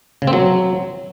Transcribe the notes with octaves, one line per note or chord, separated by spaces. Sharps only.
C#3
C4
F#3